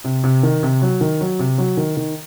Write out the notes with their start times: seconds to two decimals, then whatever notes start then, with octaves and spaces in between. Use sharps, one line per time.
0.04 C3
0.24 C3
0.43 D#3
0.63 C3
0.82 F#3
1.01 D#3
1.21 F#3
1.39 C3
1.58 F#3
1.77 D#3
1.97 D#3